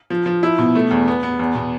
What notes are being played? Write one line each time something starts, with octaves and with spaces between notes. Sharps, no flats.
F3
F3
E4
B2
A3
E2
B3
B3
E2
B2